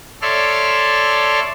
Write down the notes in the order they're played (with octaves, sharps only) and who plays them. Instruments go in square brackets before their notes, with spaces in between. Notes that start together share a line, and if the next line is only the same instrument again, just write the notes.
[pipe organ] A4 C#5 D5 E5 C6 F6